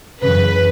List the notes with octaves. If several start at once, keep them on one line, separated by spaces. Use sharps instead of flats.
F#2 C#3 E3 B4